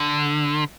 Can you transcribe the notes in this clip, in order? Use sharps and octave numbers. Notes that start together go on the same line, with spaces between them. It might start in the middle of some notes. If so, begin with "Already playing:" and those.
Already playing: D3